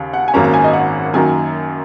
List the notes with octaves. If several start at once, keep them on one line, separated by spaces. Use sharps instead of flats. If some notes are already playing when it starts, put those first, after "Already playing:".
Already playing: D#2 C#3
F#5
G#5
G#1 F#2 F#3 A#3 C#4 A#5
A#5
G#5
D#5
F#5
F#2 D#3 F#3 A#3 G#5